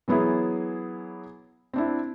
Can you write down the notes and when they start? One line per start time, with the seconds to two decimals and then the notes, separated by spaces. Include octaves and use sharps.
0.08 E3 F#3 B3 E4 G#4
1.73 C4 D4 E4